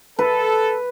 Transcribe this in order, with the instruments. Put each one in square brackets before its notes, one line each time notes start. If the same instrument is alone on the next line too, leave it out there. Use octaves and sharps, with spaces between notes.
[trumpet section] A4 [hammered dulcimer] B4